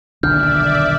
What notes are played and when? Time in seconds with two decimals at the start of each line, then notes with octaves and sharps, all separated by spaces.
0.23 D#1 B1 D3 D4 D5 E5 F6 G6